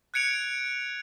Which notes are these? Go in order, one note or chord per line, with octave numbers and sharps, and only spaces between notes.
F#6 G#6 C#7 D7 F7